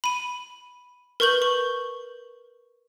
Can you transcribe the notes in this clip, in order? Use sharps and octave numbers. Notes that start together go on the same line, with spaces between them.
B5 D#7
A#4 B4 C#6 G6 F#7
C#6